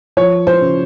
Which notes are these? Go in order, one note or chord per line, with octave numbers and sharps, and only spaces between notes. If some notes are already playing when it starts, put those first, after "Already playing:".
F3 C#5
C5
C#3